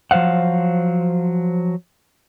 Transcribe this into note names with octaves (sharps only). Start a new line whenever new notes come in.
F3 F#3 C5 F5 F#5